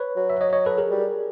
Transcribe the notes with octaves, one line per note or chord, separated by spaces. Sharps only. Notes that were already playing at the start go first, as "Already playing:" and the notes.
Already playing: B4 C#5
F#3
E5
C#5 D#5
C#5 D#5
A4 B4
G#4 A#4
G3